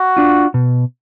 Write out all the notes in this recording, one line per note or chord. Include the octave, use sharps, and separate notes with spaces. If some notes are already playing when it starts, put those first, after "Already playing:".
Already playing: F#4
D4 F4
B2